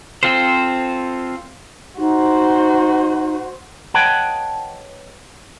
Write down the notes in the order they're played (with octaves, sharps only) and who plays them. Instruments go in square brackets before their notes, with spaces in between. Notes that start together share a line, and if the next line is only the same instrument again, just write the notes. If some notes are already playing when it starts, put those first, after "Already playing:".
[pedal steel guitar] C4 F4 A4 C5
[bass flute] D#4 [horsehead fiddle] F#4 C5
[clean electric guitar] B4 C#5 D#5 F#5 G5 A5